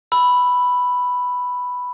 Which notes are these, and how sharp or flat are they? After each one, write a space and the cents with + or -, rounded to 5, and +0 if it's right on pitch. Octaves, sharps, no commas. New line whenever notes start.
B5 +0 E6 +5